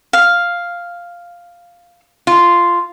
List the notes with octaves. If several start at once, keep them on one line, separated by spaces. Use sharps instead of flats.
F5
F4